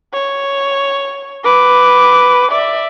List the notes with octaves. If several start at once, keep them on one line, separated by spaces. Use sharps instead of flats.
C#5
B4 D6
D5 E5